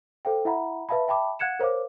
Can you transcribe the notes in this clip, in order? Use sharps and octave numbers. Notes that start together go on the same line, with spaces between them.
A4 C5 F5 G5
E4 E5 F#5 A#5 B5
B4 E5 F5 A5 B5
E5 G5 A5 B5 D6
F5 F#5 F#6 G#6 C#7 E7
A#4 C5 C#5 F5 D6